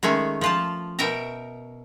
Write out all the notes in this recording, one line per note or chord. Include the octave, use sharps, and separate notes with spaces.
D#3 G#3 A3 C#4
F3 F4 A5
B2 A#4 E5 G5 A#5